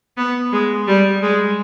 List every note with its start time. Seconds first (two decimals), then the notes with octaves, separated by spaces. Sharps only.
0.17 B3
0.52 G#3
0.87 G3
1.22 G#3